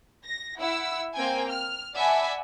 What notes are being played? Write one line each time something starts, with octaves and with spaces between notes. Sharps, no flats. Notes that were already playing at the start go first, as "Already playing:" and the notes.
A#6
E4 F#5 E6
A#3 C4 G5 G#5
F6
D5 E5 F#5 G#5 A5 B5